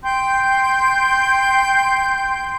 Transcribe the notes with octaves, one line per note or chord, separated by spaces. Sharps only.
G5 C6 G6